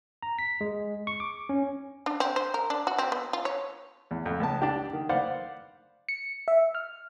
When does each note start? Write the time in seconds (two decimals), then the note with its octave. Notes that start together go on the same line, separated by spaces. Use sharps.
0.22 A#5
0.39 B6
0.61 G#3
1.07 C#6
1.20 D6
1.49 C#4
2.06 D4
2.20 C4
2.36 C5
2.54 A#4
2.70 D4
2.87 F#4
2.98 C4
3.12 B3
3.33 F4
3.45 C#5
4.11 E2
4.26 F2
4.40 C#2 B3 A5
4.62 D4 G4
4.93 D#3
5.09 B4 C5 D5 F5 F#5
6.09 C#7
6.48 E5
6.75 F6